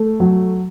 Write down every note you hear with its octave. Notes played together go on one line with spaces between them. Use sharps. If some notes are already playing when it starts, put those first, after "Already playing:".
Already playing: A3
F#3